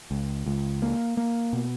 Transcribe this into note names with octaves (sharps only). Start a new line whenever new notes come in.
C#2
C#2
A#3
A#3
B2